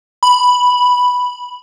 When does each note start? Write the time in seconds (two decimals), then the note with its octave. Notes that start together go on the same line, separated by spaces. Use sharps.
0.23 B5